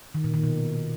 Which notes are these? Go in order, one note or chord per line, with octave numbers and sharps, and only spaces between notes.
D#3
A#2
D#3
B2